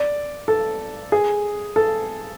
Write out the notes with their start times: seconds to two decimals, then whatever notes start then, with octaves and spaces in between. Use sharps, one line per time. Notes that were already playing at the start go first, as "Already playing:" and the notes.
Already playing: D5
0.48 A4
1.12 G#4
1.76 A4